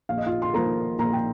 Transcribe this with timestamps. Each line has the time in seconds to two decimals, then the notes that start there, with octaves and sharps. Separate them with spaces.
0.09 A#1 F5
0.18 D#5
0.26 F4 F5
0.42 C6
0.54 A#2 F3 A#4 A#5
0.99 A#1 A#5
1.13 G5